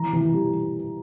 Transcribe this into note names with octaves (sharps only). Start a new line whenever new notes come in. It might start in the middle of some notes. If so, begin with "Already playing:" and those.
Already playing: E3 A#5
E3
G3